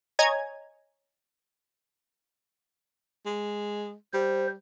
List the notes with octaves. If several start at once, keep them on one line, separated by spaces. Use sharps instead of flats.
C#5 D#5 G#5 A#5 G#6
G#3
G3 C5